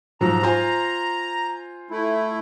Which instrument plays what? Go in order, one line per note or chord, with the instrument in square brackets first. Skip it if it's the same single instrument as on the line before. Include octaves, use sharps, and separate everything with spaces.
[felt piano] G#2 F3 F#3 [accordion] A#5
[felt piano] F4 C5 G#5
[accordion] A3 E4